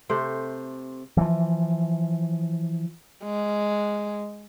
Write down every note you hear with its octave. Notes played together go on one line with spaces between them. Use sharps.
C3 A3 C5
E3 F3
G#3